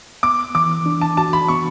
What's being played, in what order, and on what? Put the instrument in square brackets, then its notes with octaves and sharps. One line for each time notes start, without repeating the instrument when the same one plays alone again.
[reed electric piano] B3 [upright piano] D6
[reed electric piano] E3 [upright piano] D6
[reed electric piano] D4
[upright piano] A5
[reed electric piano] F#4 [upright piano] A5
[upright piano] B5
[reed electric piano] B3 [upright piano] C#6